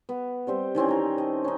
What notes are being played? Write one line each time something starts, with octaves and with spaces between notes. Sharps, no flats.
B3
G3 C4 C5 E5
D#3 E3 C4 C#4
D#4 A#5
D#5 A5
C#4 D#4